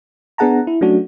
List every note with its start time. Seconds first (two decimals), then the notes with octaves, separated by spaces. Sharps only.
0.38 B3 D4 G#4 F#5 A5 A#5
0.67 E4
0.81 F#3 A3 C#4 D4 F#4